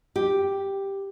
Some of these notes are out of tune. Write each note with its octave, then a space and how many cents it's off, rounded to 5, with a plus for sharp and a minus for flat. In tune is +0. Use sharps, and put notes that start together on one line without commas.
G4 +0